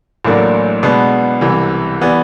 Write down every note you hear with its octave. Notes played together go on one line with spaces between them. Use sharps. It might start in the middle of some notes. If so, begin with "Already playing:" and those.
A1 A2 F#3 A#3 D4
B2 G#3 B3 D4
C2 C3 E3
E3 G3 B3